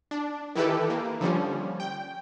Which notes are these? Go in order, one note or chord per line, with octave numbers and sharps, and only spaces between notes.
D4
D#3 E3 E4 G4 A4 B4
A#3
D3 F3 G3 C#4
G5